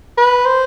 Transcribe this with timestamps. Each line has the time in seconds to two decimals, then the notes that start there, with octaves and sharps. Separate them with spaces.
0.18 B4
0.46 C5